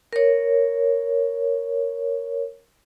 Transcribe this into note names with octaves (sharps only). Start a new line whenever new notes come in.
A#4 C#5